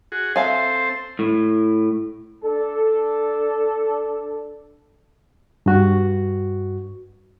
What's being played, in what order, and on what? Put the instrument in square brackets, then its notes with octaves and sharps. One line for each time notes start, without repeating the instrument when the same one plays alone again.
[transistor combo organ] F#4 G#4
[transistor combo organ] C4 A4 C5 [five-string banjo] E5 F5 G#5
[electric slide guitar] A2
[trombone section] D4 A4
[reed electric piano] G2 F#4